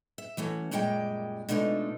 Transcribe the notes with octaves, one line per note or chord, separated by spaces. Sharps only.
E5
E3 A3 C#4 F#4
F#2 A#2 G3 G#3 G#4 G5
B2 G#3 A3 D4 D#4 F4